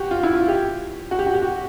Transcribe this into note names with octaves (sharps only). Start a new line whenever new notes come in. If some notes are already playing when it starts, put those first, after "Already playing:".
Already playing: F#4 G4
F4
E4
F4
G4
F#4
G4
F#4
G4
F#4